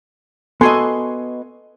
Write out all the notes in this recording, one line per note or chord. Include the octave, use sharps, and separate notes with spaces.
B3 F#4 A4 D#5 G#5 C6